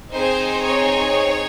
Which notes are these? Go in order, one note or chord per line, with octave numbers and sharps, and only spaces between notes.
C4 D#4 G#4 C5
C#5